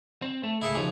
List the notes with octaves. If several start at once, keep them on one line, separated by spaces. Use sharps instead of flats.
C4
A3
C#2 A2 E4 G#4 A4
D#2 C#3 F3 G#4